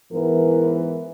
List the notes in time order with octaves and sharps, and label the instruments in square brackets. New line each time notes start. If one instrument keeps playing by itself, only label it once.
[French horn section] G#2 E3 B3 [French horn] A#4